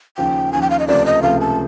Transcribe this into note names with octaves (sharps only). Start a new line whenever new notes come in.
D#2 C#3 F3 G5
D#2 C#3 F3 G#5
G5
F5
D#5
C#2 C3 F3 A3 D5
D#5
C#2 C3 F3 A3 F5
A5